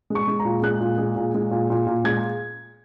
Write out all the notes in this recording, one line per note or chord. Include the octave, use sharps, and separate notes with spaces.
G#3
C#6
G#3
A#5
A#2
G#3 F#6
A#2
G#3
A#2
G#3
A#2
A#2
A#2
G#3 G#6